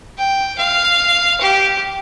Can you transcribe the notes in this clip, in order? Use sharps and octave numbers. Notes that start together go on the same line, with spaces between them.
G5
F5
G4